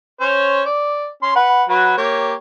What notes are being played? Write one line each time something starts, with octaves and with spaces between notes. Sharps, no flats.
C#4 C5 C#5
D5
C#4 C6
B4 F#5
F#3 F#4 B4
A#3 G4 C#5